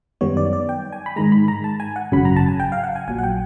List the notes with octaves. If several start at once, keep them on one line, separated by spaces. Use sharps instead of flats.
F#2 D#3 G3 B3 C#5
D5
D5
G5
G#5
B5
G#2 D#3 G#3 A#5
B5
A#5
A5
G#5
F#5
G#1 F#2 C#3 F#3 B5
A#5
A5
G#5
G5
F5
F#5
G#5
A#1 A#2 F#3 G#5
F#5
G5